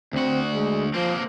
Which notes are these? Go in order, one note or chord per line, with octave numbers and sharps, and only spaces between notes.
D2 C4 F#4
G#3
F3 A#3 C4